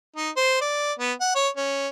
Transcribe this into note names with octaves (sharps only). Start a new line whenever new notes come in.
D#4
C5
D5
B3
F#5
C#5
C#4